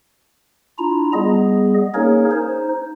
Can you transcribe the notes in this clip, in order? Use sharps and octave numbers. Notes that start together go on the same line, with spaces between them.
D4 E4 F4 A#5
G3 B3 G#4 D#5
A#3 C#4 D#4 G#4 A#4 C#5
D#4 C5